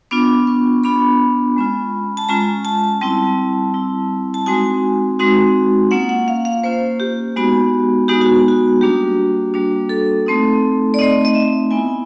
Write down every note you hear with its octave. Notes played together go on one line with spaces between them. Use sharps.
B3 D4 F4 D6
C#6
B3 D4 F4 B5
G#3 C#4 F4
A5
G#3 C#4 F4 A#5
A5
G3 C4 E4 A5
G3 C4 E4
A5
G#3 C4 D#4 F#4 G#5
G#3 C4 D#4 F#4
A#3 C#4 F4 F#5
F#5
F5
F5
A#3 C#4 F4 C5
G4
G#3 B3 D#4 F#4
G#3 B3 D#4 F#4 G4
F#4
F#4
G3 A#3 D4 F#4 G4
G3 A#3 D4 F#4
A4
A3 C4 D#4
D5
A3 C4 D#4 D#5
D#5
E5
B3 E4 G#5